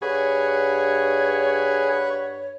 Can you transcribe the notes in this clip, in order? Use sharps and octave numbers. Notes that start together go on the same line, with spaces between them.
G2 G#4 C#5 F#5 B5 C#6